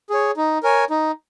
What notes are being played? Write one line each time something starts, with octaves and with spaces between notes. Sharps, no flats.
G#4 C#5
D#4
A#4 C#5 G#5
D#4